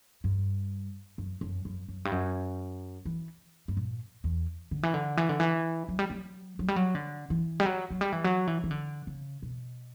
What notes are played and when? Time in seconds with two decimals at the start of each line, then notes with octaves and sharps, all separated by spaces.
0.24 G2
1.18 F#2
1.41 F#2
1.65 F#2
1.89 F#2
2.05 G2
2.12 F#2
3.05 E3
3.68 G2
3.77 A#2
4.24 E2
4.71 D3
4.83 E3
4.94 D3
5.17 E3
5.29 D3
5.40 E3
5.89 F#3
5.99 G3
6.10 F#3
6.59 F#3
6.68 G3
6.76 F#3
6.95 D3
7.30 E3
7.60 G3
7.66 F#3
7.91 F#3
8.01 G3
8.12 E3
8.24 F#3
8.47 E3
8.64 E3
8.71 D3
9.07 C#3
9.42 B2